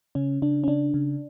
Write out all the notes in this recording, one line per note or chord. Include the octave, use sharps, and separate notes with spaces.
C#3 C#4
C#3 D4
C#4
C#3 D4
C#3